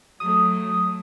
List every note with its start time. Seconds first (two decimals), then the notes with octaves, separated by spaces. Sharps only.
0.20 F#3 A3 D#6